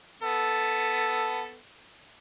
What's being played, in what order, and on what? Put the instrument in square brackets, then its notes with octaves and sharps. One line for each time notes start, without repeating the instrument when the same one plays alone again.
[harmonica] B3 A4